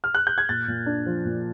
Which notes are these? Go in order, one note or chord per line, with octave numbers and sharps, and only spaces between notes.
F6
F#6
G6
G#6
A#2 A6
A#2
D4
F3
A#2